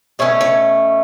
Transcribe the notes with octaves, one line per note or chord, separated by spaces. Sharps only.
B2 A3 C#4 C#5
C#5